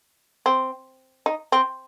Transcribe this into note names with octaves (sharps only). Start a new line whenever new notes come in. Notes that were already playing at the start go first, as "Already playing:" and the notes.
C4
D#4
C4